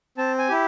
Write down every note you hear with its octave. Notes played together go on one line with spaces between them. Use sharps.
C4 A5
G#5
E4 G4